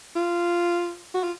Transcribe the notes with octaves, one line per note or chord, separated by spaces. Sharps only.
F4
F#4
F4